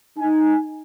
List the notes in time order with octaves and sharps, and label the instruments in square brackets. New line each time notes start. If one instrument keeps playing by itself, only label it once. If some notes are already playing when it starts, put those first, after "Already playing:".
[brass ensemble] D#4 G#5